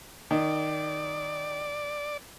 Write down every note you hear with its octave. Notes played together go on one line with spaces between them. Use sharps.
D#3 D5